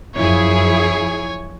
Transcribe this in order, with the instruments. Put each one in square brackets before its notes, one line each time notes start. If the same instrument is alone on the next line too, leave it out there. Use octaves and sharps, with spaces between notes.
[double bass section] F#2 F3 [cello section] E4 G#4 [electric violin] C#5 G#5